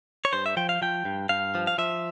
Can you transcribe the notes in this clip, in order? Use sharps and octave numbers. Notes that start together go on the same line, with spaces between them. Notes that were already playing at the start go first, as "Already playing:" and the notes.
C#5
G2 C5
E5
F3 G5
F5
F3 G5
G2
G2 F5
F3
F5
F3 E5